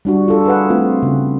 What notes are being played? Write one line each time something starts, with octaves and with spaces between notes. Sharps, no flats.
G3 D4 F#4
F4 A4
G#4 B4 F#5
A3 C4 F4
C#3